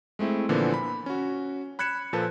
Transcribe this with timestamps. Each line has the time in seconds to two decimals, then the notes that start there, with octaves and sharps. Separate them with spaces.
0.19 G#3 A3 C4 E4
0.49 A#2 D3 E3 F3 A#3 B3
0.74 B5
1.06 C#4 F#4
1.79 B5 F#6 G#6 C#7 E7
2.13 A#2 F3 A4 B4 A5